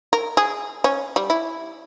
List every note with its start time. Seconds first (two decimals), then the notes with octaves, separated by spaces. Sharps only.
0.13 A#4
0.37 G#4
0.84 C#4
1.16 G3
1.30 E4